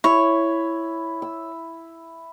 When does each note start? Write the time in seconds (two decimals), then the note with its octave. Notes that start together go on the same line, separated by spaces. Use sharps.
0.04 E4 C#5
1.22 E6